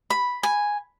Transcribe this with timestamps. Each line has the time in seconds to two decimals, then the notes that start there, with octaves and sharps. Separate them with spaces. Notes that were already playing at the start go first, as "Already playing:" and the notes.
0.10 B5
0.43 G#5